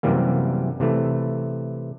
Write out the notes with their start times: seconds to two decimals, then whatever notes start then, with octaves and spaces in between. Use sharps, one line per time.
0.03 F#2 C3 E3 G3 A#3
0.80 C3 E3 A3